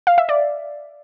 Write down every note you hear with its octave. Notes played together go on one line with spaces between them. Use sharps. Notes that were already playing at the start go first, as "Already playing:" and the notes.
F5
E5
D5